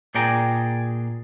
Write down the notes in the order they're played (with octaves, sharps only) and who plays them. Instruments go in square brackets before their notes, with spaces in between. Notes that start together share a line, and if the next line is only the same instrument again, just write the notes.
[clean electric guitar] A#2 D4 G#4 D5 G5 A#5